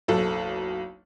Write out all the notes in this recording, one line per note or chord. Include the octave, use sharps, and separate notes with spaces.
F#1 B1 A4